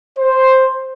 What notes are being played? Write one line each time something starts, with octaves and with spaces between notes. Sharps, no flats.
C5